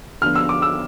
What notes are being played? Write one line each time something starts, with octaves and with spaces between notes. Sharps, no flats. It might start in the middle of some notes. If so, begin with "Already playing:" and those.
D3 F3 B3 D4 F6
E6
D6
E6